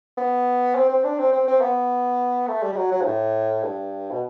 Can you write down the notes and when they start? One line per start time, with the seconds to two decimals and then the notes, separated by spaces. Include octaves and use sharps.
0.17 B3
0.76 C4
0.89 C4
1.04 D4
1.18 C4
1.32 C4
1.48 C4
1.61 B3
2.48 A3
2.63 G3
2.73 G3
2.76 F#3
2.92 F#3
3.02 G2
3.06 A2
3.63 G2
4.11 B2